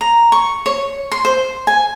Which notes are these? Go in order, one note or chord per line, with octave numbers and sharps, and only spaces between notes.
A#5
C#6
C#5
C6
C5
G#5